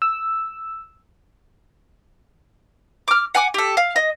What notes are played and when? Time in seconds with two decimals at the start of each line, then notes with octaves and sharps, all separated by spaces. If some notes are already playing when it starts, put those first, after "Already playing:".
0.02 E6
3.08 D6 F6
3.35 F#5 G#5 D6
3.54 G4 A4
3.77 F5
3.96 D#5